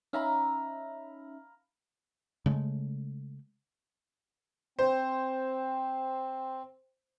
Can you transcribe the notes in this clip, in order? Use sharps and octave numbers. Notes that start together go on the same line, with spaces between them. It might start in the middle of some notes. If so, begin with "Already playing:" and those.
C#4 D#4 E5 F5 A#5 B5
C#3 G#3 A3
C4 C5